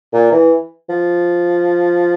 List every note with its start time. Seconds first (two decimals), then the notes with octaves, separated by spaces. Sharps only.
0.13 A#2
0.32 E3
0.89 F3